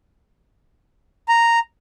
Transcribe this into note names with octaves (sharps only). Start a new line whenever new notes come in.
A#5